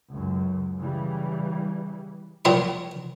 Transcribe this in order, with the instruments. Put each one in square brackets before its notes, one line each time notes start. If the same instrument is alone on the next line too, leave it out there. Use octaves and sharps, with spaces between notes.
[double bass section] C#2 F#2
C#3 E3 G3
[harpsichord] A#2 F#3 G5 C6